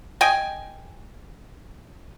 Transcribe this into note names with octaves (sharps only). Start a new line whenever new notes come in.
D#5 G5 G#5